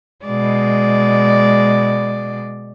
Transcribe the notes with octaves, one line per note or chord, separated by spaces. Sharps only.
B2 G#3 D5